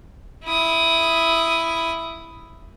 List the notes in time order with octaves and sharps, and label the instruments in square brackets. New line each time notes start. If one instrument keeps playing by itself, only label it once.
[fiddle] E4 D#6